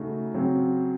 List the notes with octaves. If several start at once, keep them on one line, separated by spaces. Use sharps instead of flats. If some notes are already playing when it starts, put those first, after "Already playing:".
Already playing: C#3 A3 D#4 F#4
C#3 F#3 C4